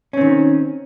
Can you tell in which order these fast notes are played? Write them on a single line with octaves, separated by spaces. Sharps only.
C#4 C4 D#3